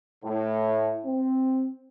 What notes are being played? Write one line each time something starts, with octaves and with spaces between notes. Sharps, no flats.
A2
C4